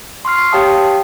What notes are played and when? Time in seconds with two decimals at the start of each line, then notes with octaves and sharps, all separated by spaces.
0.25 C6 C#6 F6 C7
0.52 G4 C#5 F5 G5 A5 D#6